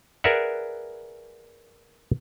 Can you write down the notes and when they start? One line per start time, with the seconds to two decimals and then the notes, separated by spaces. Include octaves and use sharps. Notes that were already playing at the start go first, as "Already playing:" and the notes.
0.24 G#4 A#4 B4 D5 E5 F#5